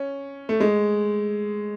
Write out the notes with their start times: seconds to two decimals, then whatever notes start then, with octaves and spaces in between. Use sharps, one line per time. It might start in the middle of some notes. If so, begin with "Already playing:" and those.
Already playing: C#4
0.49 A3
0.60 G#3